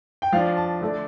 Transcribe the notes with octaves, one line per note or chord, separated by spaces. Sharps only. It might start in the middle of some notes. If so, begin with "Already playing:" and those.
G5
F3 D4 F5
A5
D3 A3 D4